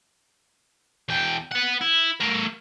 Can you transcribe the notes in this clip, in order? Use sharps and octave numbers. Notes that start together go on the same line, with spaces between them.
E2 G5
B4 F#5
E4
A3 A#4